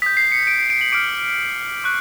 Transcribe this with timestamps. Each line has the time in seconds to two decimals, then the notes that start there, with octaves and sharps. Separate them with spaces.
0.02 D#6 G6 B6
0.17 C7
0.32 C#7
0.47 D7
0.59 D7
0.70 D7
0.81 F#7
0.92 D6 F6 D7
1.84 C#6 F#6